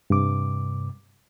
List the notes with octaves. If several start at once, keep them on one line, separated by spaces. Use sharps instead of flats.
G2 C3 D6